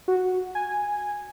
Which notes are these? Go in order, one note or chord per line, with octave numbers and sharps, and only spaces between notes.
F#4
G#5